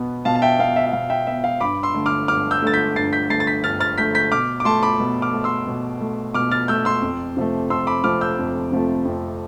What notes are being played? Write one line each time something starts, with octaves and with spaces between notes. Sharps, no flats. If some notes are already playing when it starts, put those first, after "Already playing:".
Already playing: B2 B3
B2 F5 A5
A5
E5 G5
B3 F5
E5
E5
B2 F5
E5 G5
B3 E5
F5
G2 B5 D6
C6 E6
D3 A3
D6 F6
G2 D6 F6
E6 G6
D3 A3 A6
G6 B6
G2 A6 C7
G6 B6
D3 A3 A6 C7
A6
G6 B6
G2 F6 A6
F6 A6
D3 A3 G6 B6
G6 B6
B2 D6 F6
D6
A3 A5 C6
B5 D6
B2
D6 F6
A3
C6 E6
B2
A3
B2 D6 F6
F6 A6
A3 E6 G6
C6 E6
F2
C3 F3 A3
F2 C6 E6
B5 D6
C3 F3 A3 D6 F6
E6 G6
F2
C3 F3 A3
F2